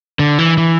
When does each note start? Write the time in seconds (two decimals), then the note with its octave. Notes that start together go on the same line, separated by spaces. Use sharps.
0.19 D3
0.39 E3
0.58 E3